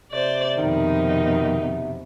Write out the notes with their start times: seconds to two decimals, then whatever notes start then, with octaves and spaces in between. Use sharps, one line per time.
0.12 C3 C5 D5
0.58 F2 B2 D#3 D#4